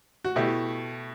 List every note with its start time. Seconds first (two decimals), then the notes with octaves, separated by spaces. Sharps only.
0.25 F#4
0.36 B2 A3 E4 G4